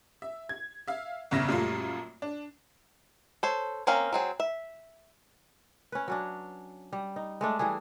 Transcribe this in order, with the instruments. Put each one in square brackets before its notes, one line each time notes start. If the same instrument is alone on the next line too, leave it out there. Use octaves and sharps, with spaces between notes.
[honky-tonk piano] E5
G#6
E5 F5
G1 E2 C#3 E5 A#6 E7
F#2 A#2 G3 A3 F4
D4
[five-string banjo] A4 C5 C#5
A#3 C4 C#4 F5 A#5
F#3 C4 G#4
E5
[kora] C#4 B4
F#3 C#4 D4
G3
D#4
G#3 A3 D4
E3 G3 A3 G#4